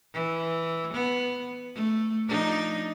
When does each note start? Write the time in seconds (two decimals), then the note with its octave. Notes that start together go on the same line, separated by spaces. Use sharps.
0.14 E3
0.94 B3
1.75 A3
2.28 F3 D4 D#4